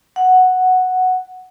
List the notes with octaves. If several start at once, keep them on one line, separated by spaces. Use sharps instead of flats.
F#5